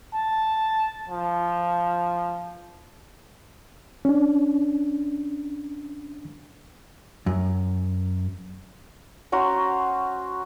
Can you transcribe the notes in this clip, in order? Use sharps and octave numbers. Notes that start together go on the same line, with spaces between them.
A5
F3
C#4 D4
F#2
C#4 F#4 C5 A#5